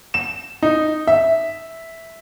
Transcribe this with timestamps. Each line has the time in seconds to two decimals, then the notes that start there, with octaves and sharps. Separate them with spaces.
0.14 E7
0.63 D#4
1.07 E5